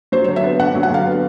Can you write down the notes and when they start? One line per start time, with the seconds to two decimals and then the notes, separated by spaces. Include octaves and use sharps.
0.12 F#3 C5
0.24 D3 C#5
0.36 E5
0.44 B3
0.59 D3 F#5
0.75 F#3
0.83 F#5
0.90 D3 F5
1.06 B3